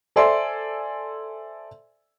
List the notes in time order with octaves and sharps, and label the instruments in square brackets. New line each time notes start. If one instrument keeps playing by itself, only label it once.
[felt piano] A4 C5 D5 E5 G#5 C6